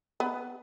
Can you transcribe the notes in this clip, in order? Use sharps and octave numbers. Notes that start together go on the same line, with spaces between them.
B3